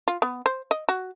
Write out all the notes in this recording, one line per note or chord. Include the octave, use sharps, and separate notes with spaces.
F4
B3
C5
D#5
F#4